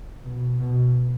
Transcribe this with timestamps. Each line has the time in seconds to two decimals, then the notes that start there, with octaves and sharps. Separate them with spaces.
0.24 B2
0.59 B2